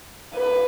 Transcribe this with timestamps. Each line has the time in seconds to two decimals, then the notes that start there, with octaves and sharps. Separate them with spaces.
0.35 B4